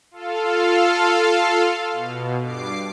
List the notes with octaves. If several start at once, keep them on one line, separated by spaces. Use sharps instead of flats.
F4 A4 F5
B2
G2 D6 C7